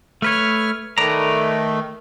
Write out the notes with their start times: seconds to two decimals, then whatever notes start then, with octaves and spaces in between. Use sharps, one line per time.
0.22 A3 B4 C#5 F6
0.98 D#3 A3 B4 D5 A#5